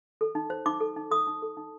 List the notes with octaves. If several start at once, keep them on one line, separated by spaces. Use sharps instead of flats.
A4
D#4
C5
D#4 D6
A4
D#4
A4 D#6
D#4
A4
D#4